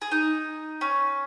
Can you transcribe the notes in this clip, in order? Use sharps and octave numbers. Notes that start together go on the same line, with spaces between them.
G#4
D#4
C#4